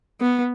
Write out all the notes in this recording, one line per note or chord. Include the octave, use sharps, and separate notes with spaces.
B3